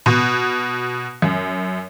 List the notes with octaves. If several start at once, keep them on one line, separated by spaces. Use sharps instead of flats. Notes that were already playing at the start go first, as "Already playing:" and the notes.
B2
F#2